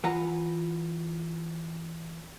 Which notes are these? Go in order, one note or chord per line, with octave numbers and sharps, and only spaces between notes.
E3 F4 B4 F#5 A#5